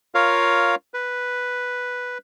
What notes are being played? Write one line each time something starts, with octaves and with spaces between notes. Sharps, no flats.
F4 A#4 C#5 F5
B4